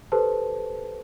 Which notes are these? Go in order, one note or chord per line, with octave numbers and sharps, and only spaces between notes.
G4 A4 B4 C5 A5